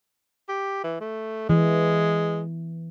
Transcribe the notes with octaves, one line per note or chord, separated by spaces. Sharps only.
G4
E3
A3
E3 G#3